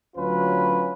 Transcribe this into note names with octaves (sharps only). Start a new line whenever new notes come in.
D2 F#3 C#4 F4 B4